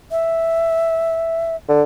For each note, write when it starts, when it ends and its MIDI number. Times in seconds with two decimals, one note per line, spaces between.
0.11 1.56 76
1.69 1.83 50